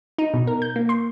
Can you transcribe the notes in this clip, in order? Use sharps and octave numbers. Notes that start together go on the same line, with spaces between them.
D#4
B2
A#4
G6
A#3
C6